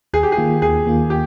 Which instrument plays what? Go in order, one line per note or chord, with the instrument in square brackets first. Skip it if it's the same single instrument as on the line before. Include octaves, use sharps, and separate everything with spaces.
[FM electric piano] D#2 [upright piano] G#4
[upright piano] G4
G#4
[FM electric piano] D#3 A#3 F4
[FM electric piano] D#2 [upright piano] G#4
[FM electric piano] D#3 A#3 F4
[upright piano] G4